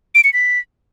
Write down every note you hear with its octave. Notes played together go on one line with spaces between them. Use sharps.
D7
C#7
B6